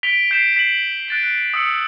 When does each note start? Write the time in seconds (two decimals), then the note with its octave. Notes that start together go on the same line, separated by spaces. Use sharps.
0.03 B6 D7 F7 G7
0.31 G6 B6 C7 D7 E7
0.55 G6 B6 C7 F#7
1.08 F#6 A6 D7
1.54 D#6 E6 C#7